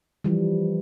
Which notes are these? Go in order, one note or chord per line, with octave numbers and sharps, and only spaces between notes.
E3 F3 G3